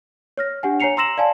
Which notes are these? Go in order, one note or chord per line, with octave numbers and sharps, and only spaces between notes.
C#5 F6 A#6
D4 G4 F#5 G#5
C#5 G#5 A#5 C7 C#7 F7
A#5 C6 E6 A#6 E7 F#7
D5 F5 G#5 A5